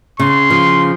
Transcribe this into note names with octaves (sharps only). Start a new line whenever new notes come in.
C#3 C6
F3